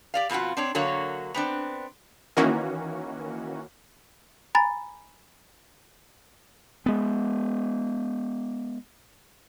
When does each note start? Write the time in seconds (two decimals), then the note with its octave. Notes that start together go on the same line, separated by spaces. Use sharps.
0.14 G4 D5 F5
0.29 F2 B2 G#3 F4 F#4
0.57 C4 D4 C#5
0.75 D3 F#3 A#3 F#4 C#5
1.34 B3 C4 D4
2.37 D#3 E3 A#3 C#4 F#4
4.55 G#5 A#5 B5 A6
6.86 G#3 B3